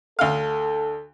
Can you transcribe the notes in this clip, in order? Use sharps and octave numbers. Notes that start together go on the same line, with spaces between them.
D2 A4 F5